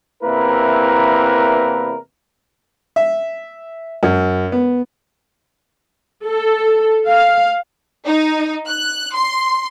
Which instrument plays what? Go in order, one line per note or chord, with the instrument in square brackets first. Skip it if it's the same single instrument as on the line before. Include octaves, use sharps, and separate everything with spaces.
[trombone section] E2 C3 A#3 E4 A#4 B4
[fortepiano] E5
F#2
B3
[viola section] A4
F5
[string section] D#4
F#6
C6